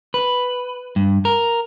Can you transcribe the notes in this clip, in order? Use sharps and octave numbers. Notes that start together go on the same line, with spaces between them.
B4
G2
A#4